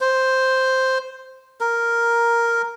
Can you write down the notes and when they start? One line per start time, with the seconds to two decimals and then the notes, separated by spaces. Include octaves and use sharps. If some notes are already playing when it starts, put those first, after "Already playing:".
0.01 C5
1.61 A#4